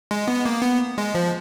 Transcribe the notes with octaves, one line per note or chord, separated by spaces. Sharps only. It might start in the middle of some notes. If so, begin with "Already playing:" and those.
G#3
B3
A#3
B3
G#3
F3